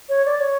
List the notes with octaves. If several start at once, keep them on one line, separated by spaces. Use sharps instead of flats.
C#5
D5
C#5